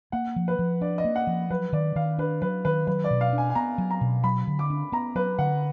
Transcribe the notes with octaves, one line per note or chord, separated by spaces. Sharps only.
A#3 F#5
F3
B4
F3
D4 D5
D#5
A#3
F#5
F3
F#3 B4
D#3 D5
D#3 F5
D4 B4
F#3 B4
D#3 B4
F#3 B4
D5
B2
F5
D4
G#5
G#5
B3 A#5
F#3
A#5
B2
F#3 B5
D3
D6
D4
B3 A#5
F#3 B4
D3 F#5